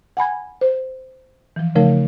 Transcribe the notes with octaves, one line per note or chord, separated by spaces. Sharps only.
F#5 G#5 B5 G#6
C5
E3 F3
C#3 F3 A3 D#4 A#4